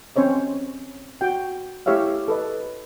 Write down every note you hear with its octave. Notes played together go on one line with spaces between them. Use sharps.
C4 C#4 C5 C#5 D#5
F#4 G5
A3 E4 G4 C#5 E5 F5
A4 B4 D#5